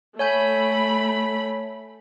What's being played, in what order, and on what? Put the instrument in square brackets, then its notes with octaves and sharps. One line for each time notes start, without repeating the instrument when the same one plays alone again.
[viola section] A3 B5 [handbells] C#5 G#5 G6